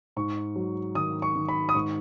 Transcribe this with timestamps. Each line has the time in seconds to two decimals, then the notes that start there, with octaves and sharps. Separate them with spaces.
0.16 G#2 C#6
0.56 F#3
0.95 D#3 D#6
1.22 C#6
1.35 D#3
1.49 B5
1.69 D#6
1.75 G#2 C#6